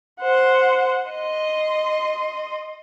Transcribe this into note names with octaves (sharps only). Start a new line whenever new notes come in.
C5 F#5
D#5 C6